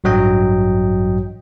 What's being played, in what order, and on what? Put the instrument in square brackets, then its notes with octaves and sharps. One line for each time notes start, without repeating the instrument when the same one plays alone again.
[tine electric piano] A1 G2 F#3 D#5 G5